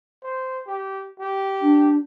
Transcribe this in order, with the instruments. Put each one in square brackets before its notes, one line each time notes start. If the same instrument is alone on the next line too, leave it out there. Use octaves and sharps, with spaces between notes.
[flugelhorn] C5
G4
G4
[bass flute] D4